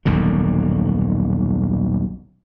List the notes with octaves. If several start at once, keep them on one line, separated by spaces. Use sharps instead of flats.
D#1 B1 F#2 D3